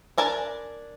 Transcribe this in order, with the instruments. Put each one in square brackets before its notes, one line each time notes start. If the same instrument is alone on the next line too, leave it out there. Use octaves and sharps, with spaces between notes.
[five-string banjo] D4 A#4 G#5 A5